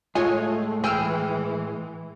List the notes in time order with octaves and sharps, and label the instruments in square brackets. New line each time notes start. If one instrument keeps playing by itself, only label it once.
[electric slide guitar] A2 G#3 [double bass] A3 [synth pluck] F4 C#5 D#5 [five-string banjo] G#5
[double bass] E3 [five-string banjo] G#4 [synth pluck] G5 E6 F6